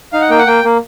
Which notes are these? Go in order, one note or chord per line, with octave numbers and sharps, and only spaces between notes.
D#4 F5
F#5
A#3 G5
F#5
A#3 G5
A#3